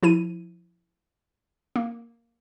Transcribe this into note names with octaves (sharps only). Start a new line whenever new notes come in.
F3 E4 D#7
A#3